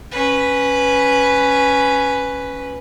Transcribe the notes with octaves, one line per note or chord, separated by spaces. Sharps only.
C#4 B4